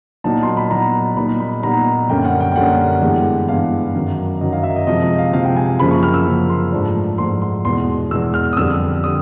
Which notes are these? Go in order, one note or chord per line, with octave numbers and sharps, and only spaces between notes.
A#2 F#3 B3 D#4 A5
C6
B5
A#2 F#3 B3 D#4 A#5
A#2 G3 B3 D#4 B5
B5
A#2 G3 B3 D#4 A#5
F#2 D3 G3 A#3 C#4 G5
F#5
G5
G5
F#2 D3 G3 A#3 C#4 F#5
G2 E3 G#3 B3
G2 E3 G#3 B3 F5
F#2 D#3 F#3
F#2 D#3 F#3 D#5
F5
E5
D#5
C3 F3 G#3 D#5
F5
C3 F3 G#3 F5
G5
G#5
F#2 C#3 F3 A#3 B5
C#6
F6
E6
F#2 C#3 F3 A#3
C6
G#2 F3 A3 D4
G#2 F3 A3 D4 C6
C6
E2 B2 G#3 C6
E2 B2 G#3 E6
F6
D#6
F2 D3 G3 E6
D3 G3 D#6